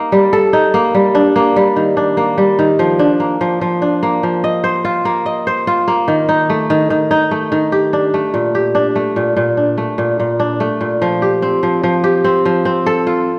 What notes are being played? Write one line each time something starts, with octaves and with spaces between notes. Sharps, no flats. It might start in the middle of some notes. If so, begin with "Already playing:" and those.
Already playing: A#3 D#4
G3
A4
D#4
A#3
G3
D4
A#3
G3
D#3
D4
A#3
G3
D#3
F3
D4
A#3
F3
F3
D4
A#3
F3
D#5
C5
F4
A#3
D#5
C5
F4
A#3
D#3
D#4
A3
D#3
D#3
D#4
A3
D#3
G4
D4
A3
A#2
G4
D4
A3
A#2
A#2
D4
A3
A#2
A#2
D4
A3
A#2
F3
G4
C4
F3
F3
G4
C4
F3
C4
A4
F4